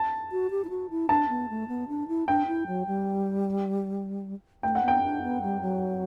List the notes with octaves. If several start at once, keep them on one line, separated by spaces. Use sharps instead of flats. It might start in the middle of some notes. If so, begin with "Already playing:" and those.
Already playing: A5
F#4
G4
E4
F#4
E4
D4 A5
B3
A3
B3
D4
E4
D4 G5
E4
F#3
G3
A3 G5
F#5
B3 G5
D4
B3
G3
F#3